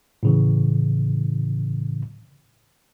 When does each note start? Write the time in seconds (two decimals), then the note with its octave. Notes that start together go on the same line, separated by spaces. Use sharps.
0.23 A2 C#3 E3